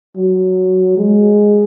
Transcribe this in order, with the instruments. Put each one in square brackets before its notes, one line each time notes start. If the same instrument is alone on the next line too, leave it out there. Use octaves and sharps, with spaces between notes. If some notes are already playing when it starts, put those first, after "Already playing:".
[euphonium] F#3
G#3